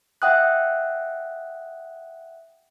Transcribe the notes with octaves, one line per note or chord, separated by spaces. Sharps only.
E5 F#5 G5 D#6 F#6